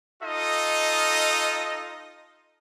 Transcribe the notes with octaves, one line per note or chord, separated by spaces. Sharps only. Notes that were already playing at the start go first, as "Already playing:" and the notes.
D#4 F4 A4 D#5